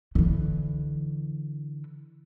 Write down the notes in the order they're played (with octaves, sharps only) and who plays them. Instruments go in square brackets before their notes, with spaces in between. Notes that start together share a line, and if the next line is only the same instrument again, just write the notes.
[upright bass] D3 E3